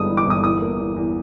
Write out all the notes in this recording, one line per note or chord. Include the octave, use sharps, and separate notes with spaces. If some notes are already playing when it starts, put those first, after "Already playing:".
Already playing: G1 G2 G#3 D#6
E3
D6
G1 D#6
E2 D#6
A#3
E2
E2